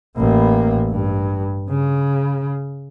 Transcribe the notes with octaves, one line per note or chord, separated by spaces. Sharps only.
A1 A#3
G2
C#3